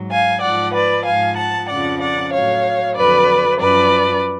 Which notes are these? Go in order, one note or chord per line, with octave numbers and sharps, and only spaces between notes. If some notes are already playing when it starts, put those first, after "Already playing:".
Already playing: G#2 F#3
F5 G#5
G#2 F3 D5 F#5
B4 D5
G#2 F3 F5 G#5
F#5 A5
F2 C#3 F3 D5 F#5
D5 F#5
A2 F#3 C#5 F5
F2 D3 F#3 B4 D5
F#2 F3 B4 D5